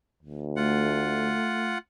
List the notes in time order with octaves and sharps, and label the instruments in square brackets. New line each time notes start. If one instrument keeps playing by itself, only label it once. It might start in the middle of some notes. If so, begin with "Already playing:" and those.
[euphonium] D2
[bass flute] A3 [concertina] F4 F#5